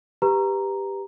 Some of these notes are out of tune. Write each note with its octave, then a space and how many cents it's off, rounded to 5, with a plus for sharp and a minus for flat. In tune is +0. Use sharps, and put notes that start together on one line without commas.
G4 +5 B4 +0 A#5 +0